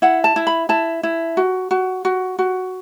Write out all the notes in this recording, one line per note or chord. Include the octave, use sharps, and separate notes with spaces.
E4 F#5
A5
E4
B5
E4 A5
E4
F#4
F#4
F#4
F#4